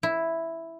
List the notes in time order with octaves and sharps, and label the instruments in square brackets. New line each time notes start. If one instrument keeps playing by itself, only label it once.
[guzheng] E4